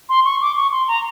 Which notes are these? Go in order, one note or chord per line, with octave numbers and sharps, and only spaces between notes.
C6
C#6
D6
C#6
C6
A#5